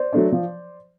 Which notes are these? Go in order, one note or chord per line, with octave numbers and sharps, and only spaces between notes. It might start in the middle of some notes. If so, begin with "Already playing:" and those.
Already playing: C5 D5
F#3 A3 D4
F3